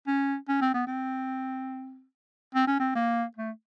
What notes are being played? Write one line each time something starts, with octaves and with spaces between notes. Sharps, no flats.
C#4
C#4
C4
B3
C4
C4
C#4
C4
A#3
A3